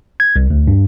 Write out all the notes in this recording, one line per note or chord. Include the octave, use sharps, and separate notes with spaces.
G#6
C2
D2
G2